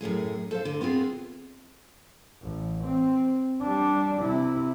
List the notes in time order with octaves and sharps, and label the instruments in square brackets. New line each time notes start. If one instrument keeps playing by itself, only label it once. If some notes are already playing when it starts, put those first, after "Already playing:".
[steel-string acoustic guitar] F#2 A2 A3 G#4
A4 C5 F5
D3
B3 C4 F4 G#4
[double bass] A1
C4
G3 D4
C3 E4